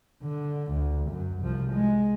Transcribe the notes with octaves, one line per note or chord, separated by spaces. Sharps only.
D3
D2
F#2
C2 F3
G#3